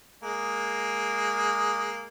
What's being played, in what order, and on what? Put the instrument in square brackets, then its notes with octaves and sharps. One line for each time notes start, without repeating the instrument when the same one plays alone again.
[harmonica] G#3 A#3